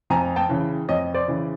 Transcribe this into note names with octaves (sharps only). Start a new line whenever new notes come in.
F2 G#5 A#5
G5 A5
C#3 E3
F2 C#5 D#5
C5 D5
C#3 E3